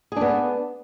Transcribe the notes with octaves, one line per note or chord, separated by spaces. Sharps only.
B3 D4 G#4